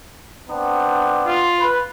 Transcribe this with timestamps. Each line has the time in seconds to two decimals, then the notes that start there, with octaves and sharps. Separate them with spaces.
0.49 B3 C4 D4
1.26 F4
1.59 B4